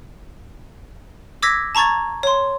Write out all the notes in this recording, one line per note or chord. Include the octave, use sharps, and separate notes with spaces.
D6 E6 G#6 A#6 B6
A5 A#5 C#6 G#6 A6
C#5 C6